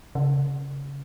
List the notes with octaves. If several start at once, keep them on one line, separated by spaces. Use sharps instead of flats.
C#3